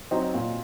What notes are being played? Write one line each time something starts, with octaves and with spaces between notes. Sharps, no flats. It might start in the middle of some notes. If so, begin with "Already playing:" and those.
F#3 C4 D#4
A#2